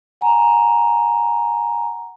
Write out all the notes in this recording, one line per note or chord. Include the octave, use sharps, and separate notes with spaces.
F#5 G#5 A#5